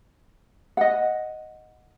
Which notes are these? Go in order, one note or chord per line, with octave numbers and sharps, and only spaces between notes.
D#5 F#5